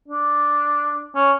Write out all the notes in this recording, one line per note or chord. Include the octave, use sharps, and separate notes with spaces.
D4
C#4